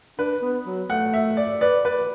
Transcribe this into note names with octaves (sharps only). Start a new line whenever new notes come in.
D4 B4
B3
F#3
A3 F#5
E5
D5
B4 D5
B4 D5